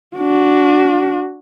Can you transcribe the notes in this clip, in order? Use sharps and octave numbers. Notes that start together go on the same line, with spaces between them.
D4 F#4